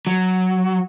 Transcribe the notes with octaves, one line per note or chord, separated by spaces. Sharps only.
F#3